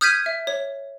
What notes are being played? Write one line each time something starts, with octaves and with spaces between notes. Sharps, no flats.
D#6 F6 G6 G#6 B6 D#7
E5
C#5